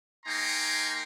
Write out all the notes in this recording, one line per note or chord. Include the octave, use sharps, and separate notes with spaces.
A#3 D#4 G5 G#5 A#5 C6